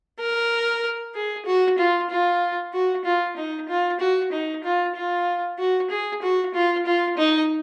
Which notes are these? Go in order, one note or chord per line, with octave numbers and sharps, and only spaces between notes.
A#4
G#4
F#4
F4
F4
F#4
F4
D#4
F4
F#4
D#4
F4
F4
F#4
G#4
F#4
F4
F4
D#4